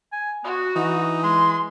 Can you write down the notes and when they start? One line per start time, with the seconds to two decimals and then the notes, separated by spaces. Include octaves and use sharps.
0.12 G#5
0.44 B3 F#4
0.76 E3 D#4
1.23 G#3 C6